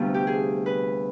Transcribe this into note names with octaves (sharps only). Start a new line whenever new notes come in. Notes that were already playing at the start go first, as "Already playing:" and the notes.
Already playing: D2 C3 G3 B3 F4
G4
G#4
B4